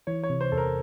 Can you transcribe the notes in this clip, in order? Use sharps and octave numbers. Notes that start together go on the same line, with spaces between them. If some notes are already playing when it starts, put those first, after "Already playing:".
E3 C#5
C#5
C3
C5
E2 A4
A#4